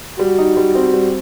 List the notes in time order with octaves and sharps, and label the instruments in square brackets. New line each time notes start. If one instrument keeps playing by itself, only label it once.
[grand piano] G3 [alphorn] F#4
[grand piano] D#4
G3
C4
G3